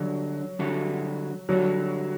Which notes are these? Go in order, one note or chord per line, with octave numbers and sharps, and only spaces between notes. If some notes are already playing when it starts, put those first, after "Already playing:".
Already playing: D3 F#3 G3 D4 F#4 A4
D3 G3 D4 F#4 A4
D3 F#3 G3 D4 F#4 A4